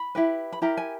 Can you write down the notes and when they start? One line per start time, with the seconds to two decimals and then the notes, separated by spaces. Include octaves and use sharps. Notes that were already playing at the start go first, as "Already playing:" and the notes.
Already playing: B5
0.15 E4 G4 B4
0.52 B5
0.62 E4 G4 A#4 A#5
0.77 G#5